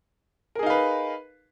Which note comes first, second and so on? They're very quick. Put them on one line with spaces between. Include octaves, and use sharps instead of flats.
A#4 G#4 D#4 F5 B4